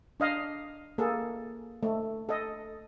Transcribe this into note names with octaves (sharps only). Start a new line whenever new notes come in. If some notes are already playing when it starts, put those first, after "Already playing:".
D4 D#5 F5
A#3 G#4 A4
A3
A4 D#5